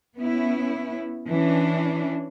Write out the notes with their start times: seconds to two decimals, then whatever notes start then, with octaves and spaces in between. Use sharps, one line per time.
0.17 B3 C#4 E4
1.30 E3 C#4 D4